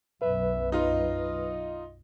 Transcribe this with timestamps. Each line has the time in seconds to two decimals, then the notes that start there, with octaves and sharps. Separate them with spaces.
0.22 B1 F#2 B4 E5
0.72 D#4 F4 D#5